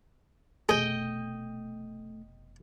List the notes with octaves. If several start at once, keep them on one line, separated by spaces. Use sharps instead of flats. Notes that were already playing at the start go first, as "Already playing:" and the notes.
F1 B2 A3 G#4 D#5 G5